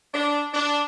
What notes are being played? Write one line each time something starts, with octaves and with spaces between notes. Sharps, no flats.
D4
D4